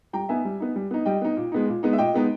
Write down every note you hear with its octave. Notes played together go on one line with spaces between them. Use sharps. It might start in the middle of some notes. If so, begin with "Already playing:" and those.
G3 G5 A#5
B3 D#4 E5 G#5
G3
B3 D#4
G3
B3 D#4
G3 D#5 G5
B3 D#4
A#2
G#3 B3 D#4
A#2
G#3 B3 D#4
E5
A#2 D#5 G5
G#3 B3 D#4